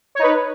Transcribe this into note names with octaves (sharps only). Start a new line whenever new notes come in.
D#4 B4 C#5